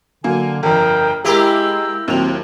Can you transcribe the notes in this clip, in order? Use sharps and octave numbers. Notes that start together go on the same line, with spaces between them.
D3 F#3 A#3 G#5
G1 F2 A#4 G5
G#3 A#3 E4 G4 G#4 A#4 E6
D#2 F#3 C4 F7